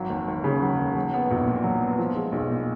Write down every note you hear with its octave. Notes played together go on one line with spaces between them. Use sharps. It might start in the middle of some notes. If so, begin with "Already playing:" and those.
Already playing: G#1 F#3
D#2
D#2
C#3
F#3
D#2
F#3
B3
A#1
A#2
F#3
B3
F3
G#3
B1
A#2